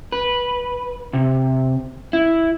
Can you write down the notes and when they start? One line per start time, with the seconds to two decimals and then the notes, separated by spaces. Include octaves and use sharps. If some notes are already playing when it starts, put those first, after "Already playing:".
0.12 B4
1.13 C3
2.13 E4